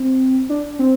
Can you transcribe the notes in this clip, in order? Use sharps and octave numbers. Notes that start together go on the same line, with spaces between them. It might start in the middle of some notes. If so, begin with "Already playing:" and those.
Already playing: C4
D4
C4